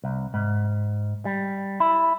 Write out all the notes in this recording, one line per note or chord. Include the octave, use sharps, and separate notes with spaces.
C2
G#2
G3
E4